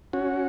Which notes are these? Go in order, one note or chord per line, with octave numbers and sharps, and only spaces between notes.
C#4 F#4